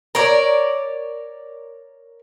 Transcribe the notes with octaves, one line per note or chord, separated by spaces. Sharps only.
A#4 C#5 D5